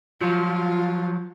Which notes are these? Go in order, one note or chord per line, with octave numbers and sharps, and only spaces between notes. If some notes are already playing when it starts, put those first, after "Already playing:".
F3 F#3 F4